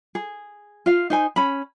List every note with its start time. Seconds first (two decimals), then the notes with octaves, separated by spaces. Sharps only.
0.15 G#4
0.86 F4 F5
1.10 D#4 C5 G#5
1.36 C#4 B5